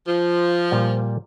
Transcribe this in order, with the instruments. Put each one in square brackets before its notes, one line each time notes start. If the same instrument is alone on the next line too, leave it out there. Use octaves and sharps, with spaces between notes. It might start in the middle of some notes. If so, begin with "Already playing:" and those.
[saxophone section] F3
[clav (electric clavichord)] A#2 G3 F5